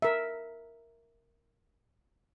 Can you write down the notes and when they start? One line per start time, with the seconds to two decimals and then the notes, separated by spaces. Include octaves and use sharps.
0.02 A#4 E5